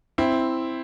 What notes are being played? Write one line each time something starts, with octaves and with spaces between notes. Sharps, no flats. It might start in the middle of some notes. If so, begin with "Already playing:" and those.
C4 E4